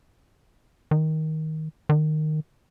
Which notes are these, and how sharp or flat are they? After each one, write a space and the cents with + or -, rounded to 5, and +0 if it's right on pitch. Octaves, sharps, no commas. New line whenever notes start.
D#3 +15
D#3 -15